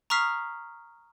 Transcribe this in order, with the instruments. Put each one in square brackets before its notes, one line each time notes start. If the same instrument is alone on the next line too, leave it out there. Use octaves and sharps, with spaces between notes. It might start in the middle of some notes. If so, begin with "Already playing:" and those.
[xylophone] A#5 C#6 D#6 F6 B6 C7